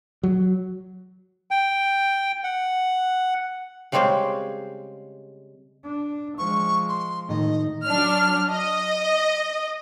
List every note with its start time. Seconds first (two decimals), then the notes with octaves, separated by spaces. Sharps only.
0.23 F#3
1.51 G5
2.44 F#5
3.92 C#3 G3 G#3 C4 C#4 C5
5.84 D4
6.38 F3 G#3 C#6
6.88 C6
7.29 A2 D#3 D#4 D#5
7.86 F#3 D4 F6
8.52 D#5